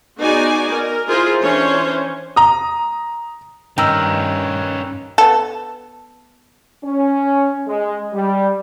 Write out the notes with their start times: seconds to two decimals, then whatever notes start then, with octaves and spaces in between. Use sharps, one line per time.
0.18 B3 D#4 F#4 G#4 D5 G#5
0.72 A#4
1.08 E4 F4 G#4 A#4 C5
1.42 E3 C#4 D4 C5 C#5
2.36 A#5 D#6
3.78 G2 D#3 C#4 B4 G5 A#5 E6
5.18 B3 A4
6.84 C#4
7.67 G#3
8.13 G3